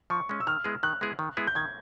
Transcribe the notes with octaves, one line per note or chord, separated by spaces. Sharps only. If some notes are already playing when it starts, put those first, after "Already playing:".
F3 C#6
G#3 C#4
E6
D#3 F6
G#3 B3 E4 G#4
D#3 F#6
G#3 B3 E4 G#4
D#3
G#3 B3 E4 G#4
G6
D#3 G#6